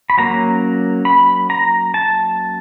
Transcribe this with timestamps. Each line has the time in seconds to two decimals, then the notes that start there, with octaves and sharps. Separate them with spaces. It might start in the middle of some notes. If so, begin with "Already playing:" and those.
0.10 B5
0.17 F#3 A#3 C#4 A#5
1.05 B5
1.50 A#5
1.94 A5